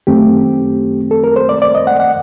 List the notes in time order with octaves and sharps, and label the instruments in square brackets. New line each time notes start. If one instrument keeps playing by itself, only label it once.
[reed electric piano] F#2 D#3 A3 C4 G4
A4
A#4
C5
D5
D5
D#5
F#5
F#5